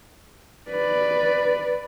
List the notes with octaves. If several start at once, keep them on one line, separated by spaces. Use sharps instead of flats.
B4 D5